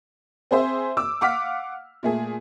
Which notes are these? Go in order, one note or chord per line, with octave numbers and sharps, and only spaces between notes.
C4 G#4 C5 E5
D6 E6
F5 F#5 D6 F6 B6
A#2 A3 G#4